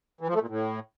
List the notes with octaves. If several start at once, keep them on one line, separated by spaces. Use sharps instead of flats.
E3
F3
A3
A#2
A2